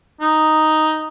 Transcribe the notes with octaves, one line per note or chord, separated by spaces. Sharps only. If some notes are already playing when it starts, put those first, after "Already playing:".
D#4